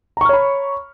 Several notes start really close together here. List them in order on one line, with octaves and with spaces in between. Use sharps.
A#5 C#6 F6 C#5 B5